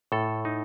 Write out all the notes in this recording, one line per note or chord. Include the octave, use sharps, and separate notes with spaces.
A2 A4
D#4